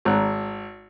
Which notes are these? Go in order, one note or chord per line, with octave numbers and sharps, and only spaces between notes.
G#1 A#5 F#6